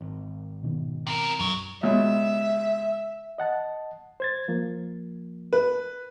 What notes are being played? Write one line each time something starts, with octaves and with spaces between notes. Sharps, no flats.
G#1
B2 D#3
C3 A#4
B1 F#2 A#4 C#5
C#2 B2 E5
D#5 F#5 A5
C5 G#6 A6
F3 A#3
B4